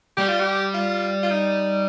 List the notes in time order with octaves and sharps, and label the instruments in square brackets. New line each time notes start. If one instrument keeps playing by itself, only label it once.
[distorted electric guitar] G3 [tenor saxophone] G4
[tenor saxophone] F4
G4
F4
F4
D#4